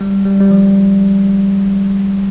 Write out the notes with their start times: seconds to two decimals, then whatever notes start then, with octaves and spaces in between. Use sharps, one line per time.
0.01 G3
0.25 G3
0.40 G3
0.51 F3